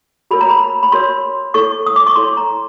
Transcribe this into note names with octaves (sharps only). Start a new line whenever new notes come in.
F#4 A#4 C#5 B5
A#5
B5
B5
F#4 A#4 C#5 C6
E4 A4 C#5 C#6
D#6
D6
C#6
E4 A4 C#5 C6
A#5